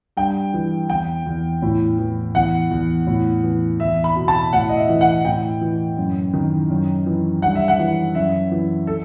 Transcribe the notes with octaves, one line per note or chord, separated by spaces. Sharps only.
G2 G5
E3
E2 G5
E2
A2
E3
E2 F#5
E2
A2
E3
E2 E5
B5
B2
A5
A2 F#5
D#5
E5
E3
F#5
A2 G5
E3
F#2
D#3
F#2
E3
G2 F#5
E5
F#5
E3
F#2 E5
E3
A4